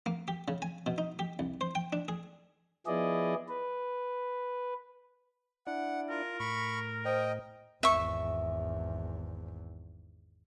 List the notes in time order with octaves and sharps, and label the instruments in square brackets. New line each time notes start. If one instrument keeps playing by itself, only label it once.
[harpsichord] A#3
G4
C#3
G#5
B2
D#4
G4
C2
C5
G5
D4
G#4
[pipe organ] F3 B3 E4 G#4 D5 D#5
B4
[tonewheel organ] D4 E4 D5 [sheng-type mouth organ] F#5
[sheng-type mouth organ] F4 [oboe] A#4
[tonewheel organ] A2 [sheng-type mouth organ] B5 C#6
[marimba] C5 [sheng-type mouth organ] D#5 G5
[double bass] G#1 E2 [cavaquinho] E5 C#6